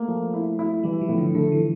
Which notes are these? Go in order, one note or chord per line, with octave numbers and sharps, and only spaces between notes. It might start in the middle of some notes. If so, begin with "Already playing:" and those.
Already playing: A3 A#3
F3
E4
E4
E3 G3
F3
A2
D3
D3 A3
E3